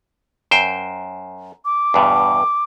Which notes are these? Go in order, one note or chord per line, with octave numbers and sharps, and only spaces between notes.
F#2 C5 G5
D6
E2 G2 B2